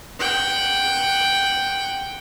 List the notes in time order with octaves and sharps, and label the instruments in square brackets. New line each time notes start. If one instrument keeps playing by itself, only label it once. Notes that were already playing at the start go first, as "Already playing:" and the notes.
[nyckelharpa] F#5 G5